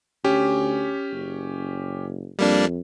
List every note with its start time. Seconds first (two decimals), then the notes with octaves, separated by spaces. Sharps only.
0.24 D2 C#4 G4
1.12 F#1
2.39 F2 G3 A#3 D4